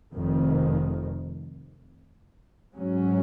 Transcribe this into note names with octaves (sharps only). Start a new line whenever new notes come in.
F1 F2 D#3
G#2 F#3 C#4